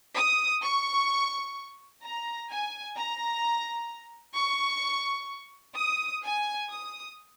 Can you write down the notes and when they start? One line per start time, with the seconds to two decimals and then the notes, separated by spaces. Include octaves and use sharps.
0.16 D#6
0.63 C#6
2.04 A#5
2.50 G#5
2.97 A#5
4.36 C#6
5.77 D#6
6.23 G#5
6.70 D#6